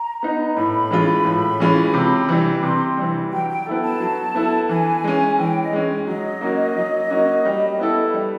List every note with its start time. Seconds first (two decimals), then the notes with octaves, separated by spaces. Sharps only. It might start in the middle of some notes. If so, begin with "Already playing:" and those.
Already playing: A#5
0.23 B3 D#4
0.56 A2 B5
0.91 E3 G#3 C#4 F4
1.25 A2
1.60 E3 G#3 C#4 F4
1.94 C3
2.29 E3 G3
2.63 C3 C6
2.97 E3 G3
3.32 F#3 G5
3.49 G5
3.66 B3 E4 A4
3.83 A5
4.00 F#3
4.35 B3 E4 A4
4.69 E3 G#5
5.04 G#3 C#4
5.39 E3 G5
5.62 D#5
5.73 G#3 C#4
6.07 F#3 D#5
6.41 A#3 C#4 F#4
6.76 F#3
7.10 A#3 C#4 F#4
7.45 G3
7.79 B3 E4 A4
8.14 G3